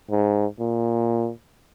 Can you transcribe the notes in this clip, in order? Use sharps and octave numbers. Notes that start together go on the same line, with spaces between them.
G#2
A#2